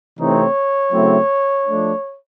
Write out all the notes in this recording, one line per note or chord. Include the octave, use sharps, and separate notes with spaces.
C3 E3 A3 C4 D#4 C#5
C#3 F#3 A3 C4 E4
F3 A3 D4